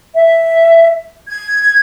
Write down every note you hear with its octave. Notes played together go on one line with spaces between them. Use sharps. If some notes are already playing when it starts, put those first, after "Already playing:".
E5
G#6